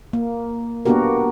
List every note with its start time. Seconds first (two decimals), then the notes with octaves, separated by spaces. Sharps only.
0.13 A#3
0.85 A#3 B3 D4 F#4 G4 A#4